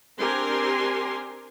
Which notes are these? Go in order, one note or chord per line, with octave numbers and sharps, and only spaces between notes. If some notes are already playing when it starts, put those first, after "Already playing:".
C4 D4 G4 A#4 G#5 C6